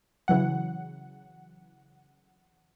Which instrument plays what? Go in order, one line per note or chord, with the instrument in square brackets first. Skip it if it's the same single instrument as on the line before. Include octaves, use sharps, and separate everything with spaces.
[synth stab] C#3 E3 F#3 F#5